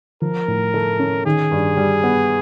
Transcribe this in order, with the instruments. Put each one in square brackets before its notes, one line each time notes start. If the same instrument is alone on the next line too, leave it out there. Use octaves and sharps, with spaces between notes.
[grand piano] F3 [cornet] A#4
[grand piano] A2
A3
C#4
[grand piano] D#3 [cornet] G#4
[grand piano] G2
G3
B3